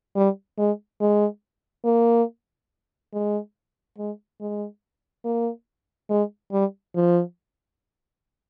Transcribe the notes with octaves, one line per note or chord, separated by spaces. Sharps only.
G3
G#3
G#3
A#3
G#3
G#3
G#3
A#3
G#3
G3
F3